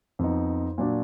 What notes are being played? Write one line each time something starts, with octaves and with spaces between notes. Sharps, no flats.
F2 F3 B3 D#4
A#2 F#3 D4